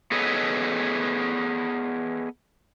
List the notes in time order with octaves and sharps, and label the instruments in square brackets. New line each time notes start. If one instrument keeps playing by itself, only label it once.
[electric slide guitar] B3 G#4 A4 B4 C#5 D#5